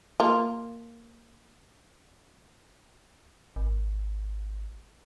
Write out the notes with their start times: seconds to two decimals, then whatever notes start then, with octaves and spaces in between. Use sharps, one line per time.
0.20 A#3 F4
3.56 G#1